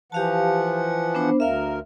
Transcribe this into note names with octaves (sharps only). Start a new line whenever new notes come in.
E3 F3 G4 F5 F#5 A5
B3 D4 C5
D2 A#4 E5 F5